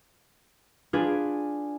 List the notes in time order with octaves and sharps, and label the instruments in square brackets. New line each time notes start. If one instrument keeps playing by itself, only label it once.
[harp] D4 F4 G#4 B4 G#5 D6